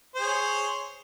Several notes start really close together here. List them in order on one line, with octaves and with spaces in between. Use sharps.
C5 G#4 C#5